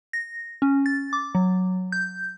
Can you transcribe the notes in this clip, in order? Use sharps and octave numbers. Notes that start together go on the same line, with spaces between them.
A#6
C#4
A6
D6
F#3
G6